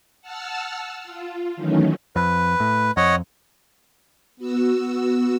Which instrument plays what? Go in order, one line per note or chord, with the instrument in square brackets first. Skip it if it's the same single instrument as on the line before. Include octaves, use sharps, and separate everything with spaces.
[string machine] F#5 A5 E6 F6
F4
D#3 E3 F#3 A3 C#4 D#4
[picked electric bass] F2 [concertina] B4
[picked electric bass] A2
[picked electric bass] F2 [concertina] C#5 D#5 F#5
[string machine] B3 F#4 E6